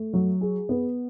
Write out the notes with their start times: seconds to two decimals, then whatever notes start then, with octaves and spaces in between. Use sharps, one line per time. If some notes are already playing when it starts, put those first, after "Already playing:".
Already playing: A3
0.13 F#3
0.41 G#4
0.69 B3